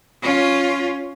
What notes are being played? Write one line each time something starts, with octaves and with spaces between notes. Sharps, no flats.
C#4 F4